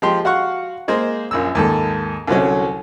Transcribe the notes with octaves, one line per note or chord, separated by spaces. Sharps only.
F3 G#3 G4 C6
F#4 F5 F#5 C#6
G#3 A#3 G#4 C5
A#1 F#2 E6
D#2 G#2 A4
C2 D3 F#3 C#4